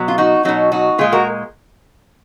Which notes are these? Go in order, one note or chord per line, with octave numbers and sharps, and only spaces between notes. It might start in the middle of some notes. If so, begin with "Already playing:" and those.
Already playing: B2 F#3
F4
D#4 F#4
B2 F#3 D#4 F#4
D#4 F#4
A#2 G#3 F4 G#4
F#4 A#4